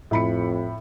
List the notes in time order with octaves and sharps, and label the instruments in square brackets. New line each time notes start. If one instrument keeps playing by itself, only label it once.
[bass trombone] F2 [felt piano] A2 B5 C#7